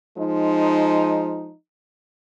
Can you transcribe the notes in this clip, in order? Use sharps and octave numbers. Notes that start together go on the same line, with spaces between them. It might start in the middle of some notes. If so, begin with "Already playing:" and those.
F3 G#3 D#4